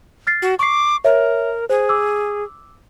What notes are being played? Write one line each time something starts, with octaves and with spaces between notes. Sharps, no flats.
F6 A6 C7
F#4
C#6 D6 C7
A#4 C#5 E5
G#4 C5
D6 E6